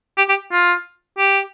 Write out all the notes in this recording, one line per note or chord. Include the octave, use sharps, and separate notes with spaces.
G4
G4
F4
G4